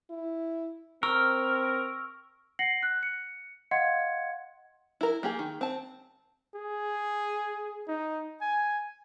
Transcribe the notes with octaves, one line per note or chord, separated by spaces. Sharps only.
E4
C4 A#4 C#6 E6 F6
F#5 A#6 C7 C#7 F#7
F#6
C#7
D#5 F5 F#5 C6 G#6 C#7
E4 A#4
A#3 G4 G#4
D#3
C4 A5
G#4
D#4
G#5